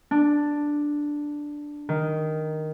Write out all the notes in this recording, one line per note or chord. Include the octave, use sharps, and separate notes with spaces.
D4
D#3